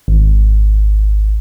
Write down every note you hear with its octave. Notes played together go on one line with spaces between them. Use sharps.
G#1